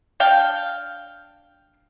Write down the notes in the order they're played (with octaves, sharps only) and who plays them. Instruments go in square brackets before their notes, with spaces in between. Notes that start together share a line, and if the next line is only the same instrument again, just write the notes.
[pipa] D4 F5 G5